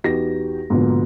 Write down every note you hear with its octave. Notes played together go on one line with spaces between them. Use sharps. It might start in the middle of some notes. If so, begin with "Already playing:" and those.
E2 D#4 F#4 G4 B4 A#6
G#2 B2 D3 F3 A#3 B3